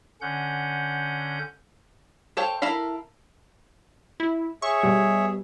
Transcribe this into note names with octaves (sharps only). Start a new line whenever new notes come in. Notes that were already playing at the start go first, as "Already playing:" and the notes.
D3 C#4 F#5 G6
A4 C5 C#5 F5 G5
E4 A4 A#4 F5 B5
E4
G#4 C#5 E5 C#6
B2 G3